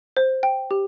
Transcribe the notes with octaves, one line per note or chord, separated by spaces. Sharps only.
C5
G5
G4